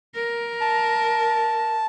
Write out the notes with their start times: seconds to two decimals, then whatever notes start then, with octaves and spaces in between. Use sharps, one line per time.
0.15 A#4
0.61 A5